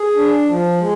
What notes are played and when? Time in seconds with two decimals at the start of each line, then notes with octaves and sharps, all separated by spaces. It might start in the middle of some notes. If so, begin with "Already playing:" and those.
Already playing: G#4
0.16 D4
0.48 F3
0.80 G#3